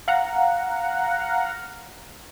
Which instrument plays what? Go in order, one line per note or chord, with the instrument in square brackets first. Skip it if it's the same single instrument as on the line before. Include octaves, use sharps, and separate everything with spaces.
[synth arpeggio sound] F5 F#5 A#5